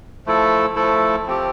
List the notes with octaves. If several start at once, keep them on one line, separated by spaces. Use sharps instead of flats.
F3 A3 E4 A4
F3 A3 E4 A4
F3 C4 G4